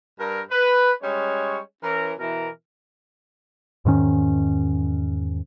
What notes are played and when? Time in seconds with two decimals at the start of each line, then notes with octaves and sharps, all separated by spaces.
0.20 G2 A#4
0.51 B4
1.02 G3 G#3 C#4 C#5
1.83 E3 C#4 A#4
2.18 B2 E3 A#4
3.85 E2 G#2 D#3 C#4